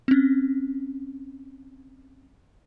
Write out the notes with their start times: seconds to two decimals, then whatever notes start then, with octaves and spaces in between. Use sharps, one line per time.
0.08 C4 C#4